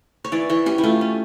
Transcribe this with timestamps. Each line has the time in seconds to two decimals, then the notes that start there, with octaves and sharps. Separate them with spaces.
0.24 C#5
0.32 E3 D5
0.49 E3 C#5
0.66 C#4 G4
0.78 E4
0.83 A3 F4
1.01 C#4